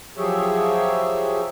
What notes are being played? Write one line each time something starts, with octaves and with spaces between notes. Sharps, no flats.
F3 F#3 G4 G#4 C#5 E5